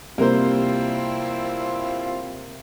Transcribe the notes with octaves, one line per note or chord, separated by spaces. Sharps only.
C3 G3 A#3 C4 E4 F4 A#4 C5